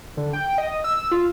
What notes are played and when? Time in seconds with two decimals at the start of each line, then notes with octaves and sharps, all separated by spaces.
0.17 D3
0.33 G5
0.58 D#5
0.84 E6
1.12 F4